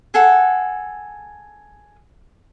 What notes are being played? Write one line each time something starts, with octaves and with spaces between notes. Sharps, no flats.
G#4 A4 F#5